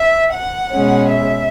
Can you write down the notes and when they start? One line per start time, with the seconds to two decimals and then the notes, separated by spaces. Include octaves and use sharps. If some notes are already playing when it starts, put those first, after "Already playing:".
Already playing: E5
0.33 F#5
0.72 B2 G#3 C#4
1.09 E5